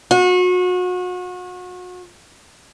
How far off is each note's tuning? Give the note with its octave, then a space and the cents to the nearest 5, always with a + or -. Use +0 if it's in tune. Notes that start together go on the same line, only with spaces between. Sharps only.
F#4 -35